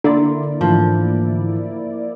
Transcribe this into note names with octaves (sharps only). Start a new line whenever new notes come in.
D3 A#3 E4 D5 A#5 C6
G#2 E3 F3 A3